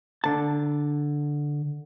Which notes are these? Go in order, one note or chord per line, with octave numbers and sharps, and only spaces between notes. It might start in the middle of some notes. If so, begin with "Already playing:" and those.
D3 A5